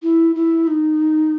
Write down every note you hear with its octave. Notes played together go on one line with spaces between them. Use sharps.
E4
E4
D#4